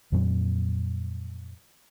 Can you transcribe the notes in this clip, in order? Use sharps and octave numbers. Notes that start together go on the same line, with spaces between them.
F2 A#2 F#3 C4